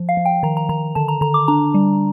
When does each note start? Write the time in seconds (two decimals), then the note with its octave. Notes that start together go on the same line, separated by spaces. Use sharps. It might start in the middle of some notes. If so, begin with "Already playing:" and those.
Already playing: F3
0.09 F5
0.17 F3
0.25 G5
0.43 D#3 A#5
0.57 A#5
0.69 D#3 A#5
0.95 D3 A5
1.08 A#5
1.21 D3 A#5
1.34 D6
1.48 D4 A#5
1.74 G3